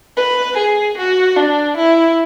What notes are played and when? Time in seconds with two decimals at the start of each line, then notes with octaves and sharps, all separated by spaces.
0.17 B4
0.57 G#4
0.97 F#4
1.36 D4
1.77 E4